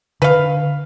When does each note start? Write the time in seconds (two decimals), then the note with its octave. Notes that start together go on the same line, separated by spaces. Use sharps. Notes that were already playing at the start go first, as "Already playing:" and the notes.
0.22 D3 B4 F5